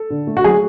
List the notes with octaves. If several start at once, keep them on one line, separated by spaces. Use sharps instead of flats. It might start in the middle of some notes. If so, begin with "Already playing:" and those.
Already playing: A4
D3
A3
F#4
F#3 G#4